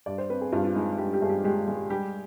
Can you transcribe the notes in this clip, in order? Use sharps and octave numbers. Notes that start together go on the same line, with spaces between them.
G2 D5
C5
C4 B4
G#4
G2 F4
F4
G#3 D#4
G2 G4
G4
G2 G#4
G4
G#3 G4
G#3
G3 G4